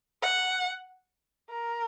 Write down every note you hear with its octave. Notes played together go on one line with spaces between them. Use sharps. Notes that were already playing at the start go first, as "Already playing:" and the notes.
F#5
A#4